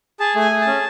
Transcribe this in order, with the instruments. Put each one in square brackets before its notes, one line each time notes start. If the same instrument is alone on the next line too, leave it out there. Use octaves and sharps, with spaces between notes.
[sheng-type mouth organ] G#4 A5
A3
G#5
G#4
A5
C#4